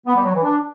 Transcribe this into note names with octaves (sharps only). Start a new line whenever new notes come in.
B3
G3
F#3
E3
D4